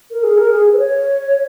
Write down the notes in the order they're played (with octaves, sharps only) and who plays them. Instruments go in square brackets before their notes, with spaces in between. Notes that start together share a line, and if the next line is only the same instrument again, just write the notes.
[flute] A#4
G#4
A#4
G#4
B4
C#5